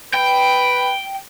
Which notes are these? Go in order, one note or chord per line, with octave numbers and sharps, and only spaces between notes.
B4 G5